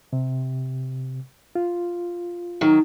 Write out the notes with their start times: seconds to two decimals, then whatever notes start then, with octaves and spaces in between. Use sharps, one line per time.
0.13 C3
1.55 F4
2.61 D#3 F#3